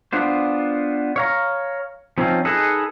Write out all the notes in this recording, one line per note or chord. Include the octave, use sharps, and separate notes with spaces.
B3 D4 F4 C5
C#5 F5 A#5
F3 C4 C#4 D#4 F4
D#4 G#4 A4 B4 D#5